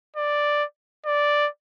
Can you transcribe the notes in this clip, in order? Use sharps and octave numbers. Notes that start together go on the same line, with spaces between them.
D5
D5